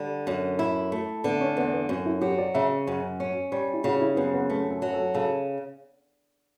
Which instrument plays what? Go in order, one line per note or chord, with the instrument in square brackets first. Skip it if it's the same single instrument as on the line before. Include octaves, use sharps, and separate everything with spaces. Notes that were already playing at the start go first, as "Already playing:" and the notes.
Already playing: [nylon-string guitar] D3 G3
F#2
E4
A3
[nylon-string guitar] D3 [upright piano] B3
[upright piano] C#4
[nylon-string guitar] E2 [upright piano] B3
[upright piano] B3
[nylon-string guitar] F#2 [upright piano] C#4
[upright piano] E4
[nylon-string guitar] F#3 [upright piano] G4
[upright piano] D5
[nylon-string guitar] C#3 [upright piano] E5
[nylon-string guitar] F#2 [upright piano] C#5
[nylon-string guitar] C#4 [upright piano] C#5
[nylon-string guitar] G3 [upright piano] C#5
[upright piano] E4
[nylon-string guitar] C#3 [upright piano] F#4
[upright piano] E4
[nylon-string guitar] F#2 [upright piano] B3
[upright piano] B3
[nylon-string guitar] A3 [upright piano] C#4
[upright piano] A4
[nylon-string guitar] F#3
[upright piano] A4
[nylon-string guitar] C#3 [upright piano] A4